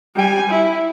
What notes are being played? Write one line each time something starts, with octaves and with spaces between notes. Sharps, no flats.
G3 G#5
E4